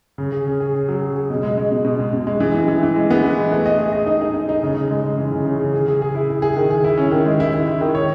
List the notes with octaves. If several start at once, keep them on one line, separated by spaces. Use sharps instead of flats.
C#3
G#4
C#4
G#4
C#4
F#3
G#4
G#4
B2
G#3
G#3
B2
B2
G#3
B2
G#3
E3
E3
E3
E3
G#3
B3
E3
G#3
A3
D#5
G#4
D#5
D#4
D#4
D#4
D#4
C#3
C#3
G#3
G#3
E3
C#3
C#3
C#3
G#4
G#4
G#4
E4
G#4
G#4
D#3
G#4
E4
C#4
D#3
G#3
E4
E4
E4
D#3
C#5